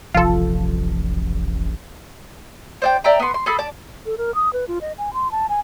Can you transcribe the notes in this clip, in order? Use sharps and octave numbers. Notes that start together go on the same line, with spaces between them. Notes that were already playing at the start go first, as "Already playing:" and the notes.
D#1 A1 C3 F3 F4 A4
C5 D5 G5
D5 E5 G5 A#5
B3 C6
C6
G#4 A4 B5 E6
D5 A5
A4
A#4
D#6
B4
F4
D#5
G#5
C6
A5
G#5